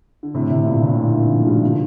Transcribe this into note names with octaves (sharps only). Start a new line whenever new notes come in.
D3
A2 C3
A2 C3
G2 A#2
A2 C3
A#2 D3
C3 D#3
D3 F3
A3
D#3 G3
D3 F3